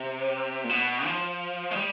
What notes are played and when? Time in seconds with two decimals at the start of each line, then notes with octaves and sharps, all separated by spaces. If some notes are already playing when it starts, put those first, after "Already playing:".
Already playing: C3
0.64 A#2
0.69 B2
1.05 F3
1.71 G#3
1.76 G3